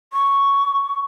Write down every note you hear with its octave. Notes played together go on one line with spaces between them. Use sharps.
C#6